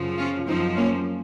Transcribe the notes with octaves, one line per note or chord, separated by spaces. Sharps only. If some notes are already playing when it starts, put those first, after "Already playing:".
Already playing: F#2 C#3 F3
C#4 F4
F#2 F3 C4 D#4
A#3 C#4